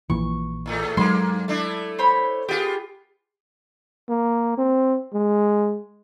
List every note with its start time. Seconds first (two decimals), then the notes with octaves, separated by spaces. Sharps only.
0.10 A#1 A#2 E3 C#6
0.66 E2 A2 A3
0.97 G2 F#3 G#3 A#3 C6
1.48 A3 D4 E4
1.99 C5 C#5 B5
2.49 B3 F4 G4 G#4
4.09 A#3
4.58 C4
5.14 G#3